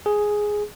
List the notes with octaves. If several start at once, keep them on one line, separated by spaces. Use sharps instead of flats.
G#4